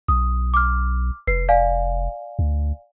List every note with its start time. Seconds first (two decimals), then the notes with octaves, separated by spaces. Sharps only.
0.08 B1 D#6
0.54 D6 F6
1.27 F1 B4 C7
1.49 D5 F5 G#5
2.39 D2